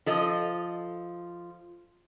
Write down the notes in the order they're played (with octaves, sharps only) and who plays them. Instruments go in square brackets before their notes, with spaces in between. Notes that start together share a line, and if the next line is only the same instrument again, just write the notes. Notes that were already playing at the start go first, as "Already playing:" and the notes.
[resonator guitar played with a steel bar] F3 A4 D#5